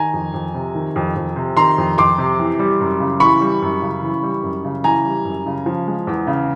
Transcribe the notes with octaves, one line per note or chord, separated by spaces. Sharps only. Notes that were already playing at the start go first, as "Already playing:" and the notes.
Already playing: D#3 G#5 A#5
F2
F2
C3
D#3
F2
F2
C3
D#3 A#5 C6
F2
F2 C6 D6
C3
E3
G3
F#2
C#3
E3 B5 C#6
G3
F#2
C#3
E3
G3
F#2
C#3
E3 G#5 A#5
G3
F#2
C#3
F3
G#3
E2
C#3